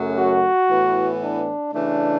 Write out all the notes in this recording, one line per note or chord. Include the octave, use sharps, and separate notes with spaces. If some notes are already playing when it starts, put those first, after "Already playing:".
Already playing: F#2 C#3 F#3 A3
F#4
A2 E3 B3
D4
C#3 E3 A3 D4